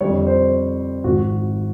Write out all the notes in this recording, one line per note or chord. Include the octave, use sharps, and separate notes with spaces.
F2 D3 G3 C#5
C5
G#1 G#2 F3 F#4